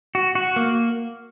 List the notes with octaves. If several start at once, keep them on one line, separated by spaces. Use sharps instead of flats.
F#4
F#4
A#3